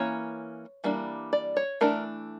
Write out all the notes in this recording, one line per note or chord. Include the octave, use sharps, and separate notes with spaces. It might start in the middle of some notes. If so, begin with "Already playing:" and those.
Already playing: E3 A#3 C#4 C#5
E3 G3 A#3 D4
D5
C#5
E3 A3 D4 A#4